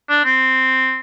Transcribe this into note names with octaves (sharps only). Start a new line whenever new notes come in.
D4
C4